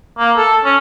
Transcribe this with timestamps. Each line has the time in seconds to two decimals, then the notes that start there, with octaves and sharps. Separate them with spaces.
0.19 A#3
0.37 A4
0.65 C#4